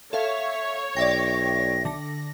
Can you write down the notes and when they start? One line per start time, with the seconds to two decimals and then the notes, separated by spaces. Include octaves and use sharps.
0.13 A4 C#5 E5 F5
0.97 B1 D5 E5 G5 A#6
1.85 D3 A#6